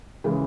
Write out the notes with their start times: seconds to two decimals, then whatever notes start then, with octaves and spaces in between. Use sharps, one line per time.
0.24 C#3 E3 G#3